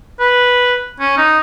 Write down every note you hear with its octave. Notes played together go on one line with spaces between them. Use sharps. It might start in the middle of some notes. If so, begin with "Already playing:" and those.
B4
C#4
D#4